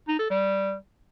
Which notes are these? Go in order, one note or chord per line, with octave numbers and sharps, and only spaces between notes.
D#4
A4
G3